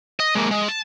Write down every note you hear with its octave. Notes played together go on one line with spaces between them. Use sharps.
D#5
G#3 A#3
G#3
A5